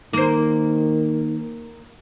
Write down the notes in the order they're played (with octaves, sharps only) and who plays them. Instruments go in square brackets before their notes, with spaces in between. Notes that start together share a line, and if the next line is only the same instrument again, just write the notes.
[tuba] D#3 [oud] A#3 C5